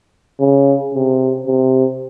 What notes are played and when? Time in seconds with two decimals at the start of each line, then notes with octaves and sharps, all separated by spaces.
0.40 C#3
0.94 C3
1.47 C3